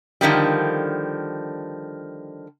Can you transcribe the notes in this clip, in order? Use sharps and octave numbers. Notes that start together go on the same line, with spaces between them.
D3 D#3 F3 G3